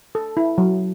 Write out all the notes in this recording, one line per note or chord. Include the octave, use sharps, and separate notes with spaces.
A4
E4
F#3